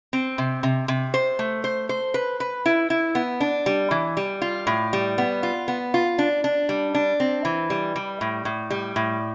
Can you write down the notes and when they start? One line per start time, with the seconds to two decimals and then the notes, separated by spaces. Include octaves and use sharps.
0.13 C4
0.38 C3
0.63 C3
0.88 C3
1.14 C5
1.39 A3
1.64 C5
1.89 C5
2.14 B4
2.40 B4
2.66 E4
2.90 E4
3.15 B3
3.40 D4
3.66 G3
3.91 E3
4.17 G3
4.42 F4
4.67 A2
4.93 G3
5.18 B3
5.43 F4
5.68 B3
5.94 F4
6.18 D4
6.44 D4
6.69 G3
6.95 D4
7.20 C4
7.45 E3
7.70 G3
7.96 G3
8.21 A2
8.45 A2
8.70 G3
8.96 A2